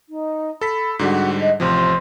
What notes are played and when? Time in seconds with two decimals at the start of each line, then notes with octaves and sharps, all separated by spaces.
0.09 D#4
0.61 A4 B5 B6
0.99 G#2 D3 G3 F#4
1.41 D#5
1.60 A1 C3 F3 C5